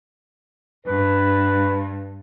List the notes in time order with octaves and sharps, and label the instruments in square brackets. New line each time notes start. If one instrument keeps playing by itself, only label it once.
[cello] G2 [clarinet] B4